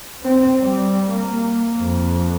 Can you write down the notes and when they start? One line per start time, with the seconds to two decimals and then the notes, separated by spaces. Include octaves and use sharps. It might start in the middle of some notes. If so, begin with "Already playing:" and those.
0.23 C4
0.60 G3
1.10 A#3
1.76 F2